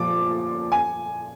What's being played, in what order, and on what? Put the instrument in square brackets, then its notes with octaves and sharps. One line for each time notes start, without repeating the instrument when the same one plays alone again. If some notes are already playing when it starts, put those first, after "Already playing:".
Already playing: [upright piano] A#2 F3 D6
G#5